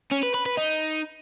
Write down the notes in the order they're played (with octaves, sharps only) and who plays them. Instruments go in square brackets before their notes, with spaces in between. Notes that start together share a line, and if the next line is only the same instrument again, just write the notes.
[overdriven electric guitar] C#4
B4
B4
B4
D#4